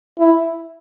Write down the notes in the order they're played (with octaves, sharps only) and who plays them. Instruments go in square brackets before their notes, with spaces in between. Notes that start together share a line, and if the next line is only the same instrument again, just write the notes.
[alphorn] E4